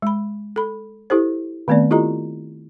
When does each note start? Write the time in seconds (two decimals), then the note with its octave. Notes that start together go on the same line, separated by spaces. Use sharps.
0.02 G#3 B5
0.56 A4 B5
1.10 E4 G4 A4 C5
1.68 D#3 A3 B3 C4 D5
1.91 E4 F4 G4 A4 D#5 A#5